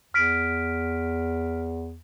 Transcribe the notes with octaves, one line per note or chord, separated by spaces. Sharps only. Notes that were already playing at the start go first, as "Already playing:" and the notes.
E2 F6 B6 D7